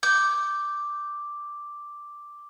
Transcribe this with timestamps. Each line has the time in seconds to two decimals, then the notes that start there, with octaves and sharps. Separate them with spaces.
0.03 D6 G6